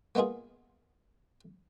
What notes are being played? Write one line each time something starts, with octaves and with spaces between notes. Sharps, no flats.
A#3 B3 D#4 F4 G#4